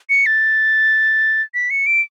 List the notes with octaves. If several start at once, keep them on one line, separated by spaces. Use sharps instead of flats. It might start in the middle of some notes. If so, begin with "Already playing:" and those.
C#7
A6
B6
C#7
D7